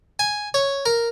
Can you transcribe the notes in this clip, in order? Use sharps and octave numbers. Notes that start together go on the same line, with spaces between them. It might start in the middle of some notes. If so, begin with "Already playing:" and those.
G#5
C#5
A#4